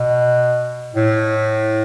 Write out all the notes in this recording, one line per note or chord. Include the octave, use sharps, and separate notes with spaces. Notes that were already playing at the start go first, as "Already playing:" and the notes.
Already playing: B2
A2